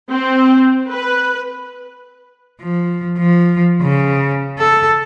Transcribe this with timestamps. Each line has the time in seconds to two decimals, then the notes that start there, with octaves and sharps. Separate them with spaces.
0.11 C4
0.89 B4
2.61 F3
3.18 F3
3.82 C#3
4.59 A4